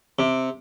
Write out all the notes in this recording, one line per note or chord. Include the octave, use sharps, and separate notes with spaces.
C3